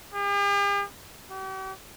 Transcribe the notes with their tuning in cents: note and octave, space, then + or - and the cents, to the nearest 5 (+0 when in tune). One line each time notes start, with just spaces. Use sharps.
G4 +45
G4 -45